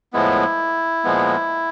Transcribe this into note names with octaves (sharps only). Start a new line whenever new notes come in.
A2 F3 G#3 B3 E4
A#2 F3 G#3 B3